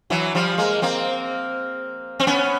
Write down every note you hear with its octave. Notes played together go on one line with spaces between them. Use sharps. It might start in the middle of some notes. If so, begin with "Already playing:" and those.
E3 F#3
F3 G3
G#3 A#3
A#3 C4
C4
B3 C#4